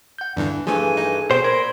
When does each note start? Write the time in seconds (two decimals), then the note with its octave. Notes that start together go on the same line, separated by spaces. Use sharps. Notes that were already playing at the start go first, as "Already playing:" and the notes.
0.19 F#5 G6
0.37 E2 G2 D3 E3 D4 E4
0.67 G2 E3 F3 A3 G#4 A4 G#5
0.97 D#4
1.31 B2 C5 G5
1.44 A#2 A#4 C5 B5 C6 G#6